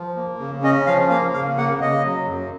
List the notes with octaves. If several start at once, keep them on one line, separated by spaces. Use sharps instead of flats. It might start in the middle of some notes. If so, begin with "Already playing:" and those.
Already playing: F3
A#3
C#3
C#4 D#5
F3 F5
A#3 F5
C#3 F5
A#3 F#5
C#3 D#5
F#3
F#2